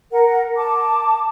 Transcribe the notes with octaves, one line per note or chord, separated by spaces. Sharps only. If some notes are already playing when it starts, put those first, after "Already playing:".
A#4 F#5
A5 D6